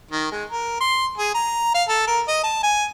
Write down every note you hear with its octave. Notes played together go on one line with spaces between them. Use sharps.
D#3
G#3
A#4
C6
G#4
A#5
F5
A4
A#4
D#5
A5
G#5